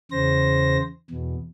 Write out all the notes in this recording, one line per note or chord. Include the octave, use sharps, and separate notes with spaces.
E2 C#3 C5 A#6
E2 B2